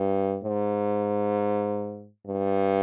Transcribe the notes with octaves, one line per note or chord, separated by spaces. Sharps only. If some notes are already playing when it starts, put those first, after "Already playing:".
Already playing: G2
G#2
G2